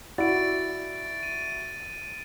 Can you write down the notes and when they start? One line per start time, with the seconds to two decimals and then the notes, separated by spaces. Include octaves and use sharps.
0.18 E4 F#4 D5 A6 D7
1.23 D#7